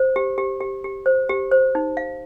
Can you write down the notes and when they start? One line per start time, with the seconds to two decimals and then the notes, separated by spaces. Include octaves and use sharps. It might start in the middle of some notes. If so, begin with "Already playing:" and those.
Already playing: C5
0.16 G4
0.38 G4
0.60 G4
0.84 G4
1.06 C5
1.29 G4
1.52 C5
1.75 D#4
1.97 F5